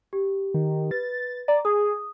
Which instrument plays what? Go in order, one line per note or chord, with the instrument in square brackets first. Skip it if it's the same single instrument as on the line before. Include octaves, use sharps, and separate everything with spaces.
[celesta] G4
[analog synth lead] D#3
[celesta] B4 [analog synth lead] A6
[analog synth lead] D5 [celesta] A#5
[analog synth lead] G#4 [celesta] D#6